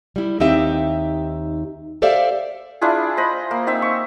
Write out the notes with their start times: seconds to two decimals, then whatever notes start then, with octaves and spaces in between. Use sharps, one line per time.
0.16 G3 E4
0.40 D#2 C4 D#4 G4 E5
2.02 G4 A4 C5 D5 E5 F5
2.81 D4 E4 F4 G#4
3.17 C5 D#5 B5
3.51 A#3
3.67 C4 D#4 E5
3.82 C#6